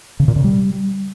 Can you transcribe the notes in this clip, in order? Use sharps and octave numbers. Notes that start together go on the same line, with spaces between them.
C#3
A#2
C#3
G3